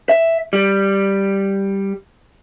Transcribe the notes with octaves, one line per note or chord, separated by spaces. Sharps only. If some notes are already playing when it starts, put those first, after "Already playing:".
E5
G3